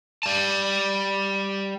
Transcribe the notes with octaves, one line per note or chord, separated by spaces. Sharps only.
G3 A5